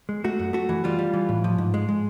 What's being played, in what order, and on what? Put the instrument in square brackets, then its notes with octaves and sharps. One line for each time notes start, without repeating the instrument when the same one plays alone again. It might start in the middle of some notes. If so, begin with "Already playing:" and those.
[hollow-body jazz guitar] G#3
A3 F#4
F#2
A3 F#4
E3
G3 F4
G3
E3
A2
F3
G#2
G#3
G#3